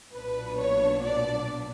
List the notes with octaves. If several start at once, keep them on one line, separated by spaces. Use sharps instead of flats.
B1 A#2 F#3 B3 D4 B4
C#5
D5